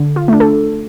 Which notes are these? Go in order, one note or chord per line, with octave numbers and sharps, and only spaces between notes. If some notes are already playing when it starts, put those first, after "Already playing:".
Already playing: D3
F4
A3 D4
A4